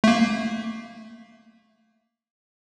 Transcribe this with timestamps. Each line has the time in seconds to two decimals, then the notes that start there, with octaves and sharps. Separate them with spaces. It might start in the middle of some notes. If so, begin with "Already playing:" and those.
0.04 A3 A#3